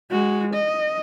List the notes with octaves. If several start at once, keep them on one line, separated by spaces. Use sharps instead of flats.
G#3 F#4
D#5